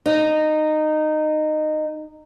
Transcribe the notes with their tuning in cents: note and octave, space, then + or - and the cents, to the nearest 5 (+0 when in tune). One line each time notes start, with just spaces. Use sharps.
D#4 -15